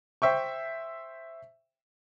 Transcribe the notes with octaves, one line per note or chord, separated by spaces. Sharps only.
C5 E5 G5 C#6